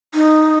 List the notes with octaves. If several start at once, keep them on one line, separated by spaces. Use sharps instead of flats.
D#4